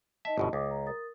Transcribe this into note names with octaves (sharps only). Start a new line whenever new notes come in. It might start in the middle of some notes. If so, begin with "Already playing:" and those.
D#4 D#5 E5 A5
G1 F#2 B2
C#2 D6 D#6
A#5
A#4 D#6 A6